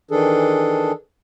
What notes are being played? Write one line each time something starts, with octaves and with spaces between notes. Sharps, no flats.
D#3 E3 D4 G#4 A4